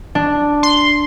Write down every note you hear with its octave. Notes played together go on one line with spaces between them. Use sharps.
D4
C6